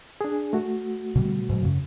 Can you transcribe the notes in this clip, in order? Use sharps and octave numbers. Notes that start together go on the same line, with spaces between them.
D4 G#4
A3 F#4
B2 D3 G3
G#2 B2 F#3
F#2 C#3